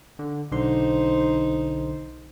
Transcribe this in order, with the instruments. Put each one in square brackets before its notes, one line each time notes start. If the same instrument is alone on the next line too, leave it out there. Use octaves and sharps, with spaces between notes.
[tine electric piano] D3
[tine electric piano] B1 D3 C6 [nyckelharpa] D#4 C5